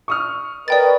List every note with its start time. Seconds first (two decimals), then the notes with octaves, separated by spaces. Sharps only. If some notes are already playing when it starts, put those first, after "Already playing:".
0.08 C#6 D#6 F6
0.68 A#4 B4 D5 D#5 G5 A6